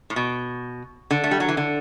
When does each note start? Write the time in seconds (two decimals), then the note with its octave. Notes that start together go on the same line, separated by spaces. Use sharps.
0.10 A2
0.16 B2
1.11 D3
1.24 A3
1.31 G3
1.40 F#3
1.49 E3
1.57 D3